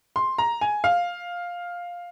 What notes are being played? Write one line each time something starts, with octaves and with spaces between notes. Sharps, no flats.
C6
A#5
G#5
F5